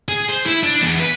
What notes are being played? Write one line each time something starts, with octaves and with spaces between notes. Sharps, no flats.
G#4
C5
E4
D4
E2
B4